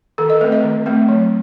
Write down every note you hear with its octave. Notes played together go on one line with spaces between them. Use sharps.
D#3 A4
D#5
A3 C4 B4
D#5
D#3
A3 C4
F#3